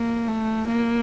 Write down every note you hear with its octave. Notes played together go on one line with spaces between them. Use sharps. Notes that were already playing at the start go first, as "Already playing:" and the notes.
Already playing: A#3
A3
A#3